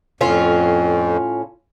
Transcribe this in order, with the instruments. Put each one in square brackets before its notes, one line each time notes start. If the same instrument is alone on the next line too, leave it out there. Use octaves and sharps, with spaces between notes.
[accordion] F2 [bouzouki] A2 C#4 F4